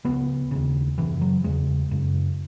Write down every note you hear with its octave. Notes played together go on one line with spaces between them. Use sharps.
C#2 C#3 B3
D#2 C#3
F#2 C#3 E3
F#3
E2 C#3 G#3
F#2 C#3